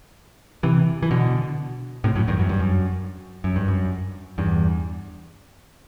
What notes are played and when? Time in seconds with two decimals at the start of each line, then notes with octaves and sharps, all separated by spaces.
0.63 C3 E3
1.03 E3
1.11 B2 D3
2.04 A2 C3
2.15 F#2 A2
2.28 E2 G2
2.39 F#2
2.49 G2
2.60 F#2
3.44 F#2
3.56 G2
3.68 F#2
4.38 E2 G2